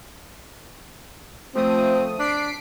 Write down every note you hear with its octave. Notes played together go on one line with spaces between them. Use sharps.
F3 A3 C4 D#6
D4 B6 C7 D7